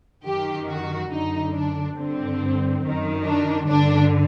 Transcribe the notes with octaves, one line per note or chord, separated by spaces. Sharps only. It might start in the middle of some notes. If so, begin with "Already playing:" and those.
F#2 D#3 G4
F#4
F#2 D3 D#4
D4
G2 D3 C4
F#2 D#3
D4
G2 D3 D4